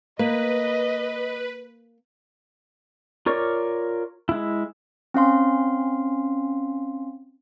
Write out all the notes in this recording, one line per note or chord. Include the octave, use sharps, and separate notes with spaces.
A#3 B4 D#5
F4 A#4 C#5 D5 C#6
G#3 E4
C4 C#4 F5 C6